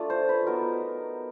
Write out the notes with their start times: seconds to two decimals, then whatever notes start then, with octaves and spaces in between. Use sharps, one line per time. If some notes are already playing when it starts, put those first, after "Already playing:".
Already playing: A3 D4 F4
0.10 C5
0.29 B4
0.47 F#3 B3 D#4 A#4